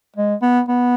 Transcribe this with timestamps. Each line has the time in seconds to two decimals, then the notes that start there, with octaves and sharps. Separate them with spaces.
0.16 G#3
0.42 B3
0.69 B3